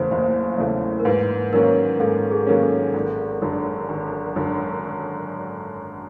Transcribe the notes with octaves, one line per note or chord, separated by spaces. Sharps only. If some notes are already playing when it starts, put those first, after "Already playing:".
Already playing: F#1 E2 C#3 E3 A3 C5
F#1 C5
E2 C#3 E3 A3
A#4
G#2 B4
D#3 F#3 A#3 C#4 A#4
G#2 A4
G#4
D#3 F#3 A#3 C#4
A4
G#1
F#2 D3
G#1
F#2 D3